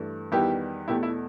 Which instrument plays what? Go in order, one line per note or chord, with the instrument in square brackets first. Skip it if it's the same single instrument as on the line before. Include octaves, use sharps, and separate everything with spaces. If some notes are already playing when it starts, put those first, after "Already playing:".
Already playing: [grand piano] G2 E3 A3
E2 D#3 G3 B3 E4 G4
E2 B2 A3 E4 G4
E4